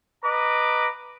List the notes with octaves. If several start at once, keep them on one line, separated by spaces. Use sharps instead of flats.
B4 D#5 A#5 D6